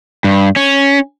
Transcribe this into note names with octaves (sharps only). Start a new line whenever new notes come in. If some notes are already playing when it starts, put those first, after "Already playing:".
G2
C#4